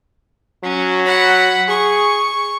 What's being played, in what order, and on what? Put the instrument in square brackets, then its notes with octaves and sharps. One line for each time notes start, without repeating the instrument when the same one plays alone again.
[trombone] F#3 [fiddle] C#4
[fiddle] F#5 B5
[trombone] G#4 [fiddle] C#6